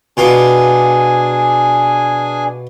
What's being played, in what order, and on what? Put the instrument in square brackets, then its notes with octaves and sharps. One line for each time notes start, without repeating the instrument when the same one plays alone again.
[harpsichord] B2 F4 D6 [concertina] D4 G#4 G#5